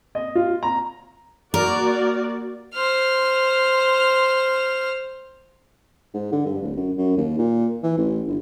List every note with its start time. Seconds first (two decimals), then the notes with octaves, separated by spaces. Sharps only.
0.15 D#5
0.35 F4
0.63 A#5
1.54 A#3 F#4 A#4 D5
2.74 C5 F6
6.14 G#2
6.32 D3
6.46 G2
6.62 D1
6.76 F#2
6.97 F#2
7.17 D#2
7.38 A#2
7.83 E3
7.97 A1
8.28 G1